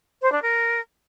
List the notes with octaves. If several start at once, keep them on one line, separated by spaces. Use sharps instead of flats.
C5
D4
A#4